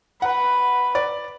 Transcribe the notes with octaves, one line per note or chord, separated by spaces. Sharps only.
B4 F#5
D5